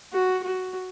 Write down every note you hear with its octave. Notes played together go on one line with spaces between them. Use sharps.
F#4
F#4